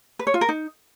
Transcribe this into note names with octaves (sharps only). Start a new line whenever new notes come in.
B4
C#5
F4
A#4
D#4